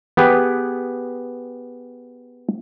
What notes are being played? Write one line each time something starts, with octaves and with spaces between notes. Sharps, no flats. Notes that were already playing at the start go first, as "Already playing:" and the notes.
B3 G4 G#4 B4